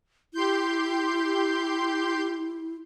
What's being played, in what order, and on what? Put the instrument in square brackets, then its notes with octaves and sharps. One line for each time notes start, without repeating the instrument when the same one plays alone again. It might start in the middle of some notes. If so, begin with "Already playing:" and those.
[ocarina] E4 [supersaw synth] G4 C6 G6